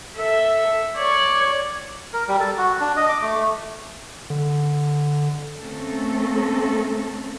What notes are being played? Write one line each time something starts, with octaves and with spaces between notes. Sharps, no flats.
A4 E5
C#5 D5
A#4
G3
A4
F#4
D4
D#5
D6
A3
A3
D3
A3 A#3 C4 C#4 A4